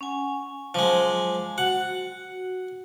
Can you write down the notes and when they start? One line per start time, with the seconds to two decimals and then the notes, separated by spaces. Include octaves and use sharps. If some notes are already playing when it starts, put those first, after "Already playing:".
0.01 C#4 F#5 G#5
0.75 F3 F#3 G#3 D6
1.58 F#4 F#5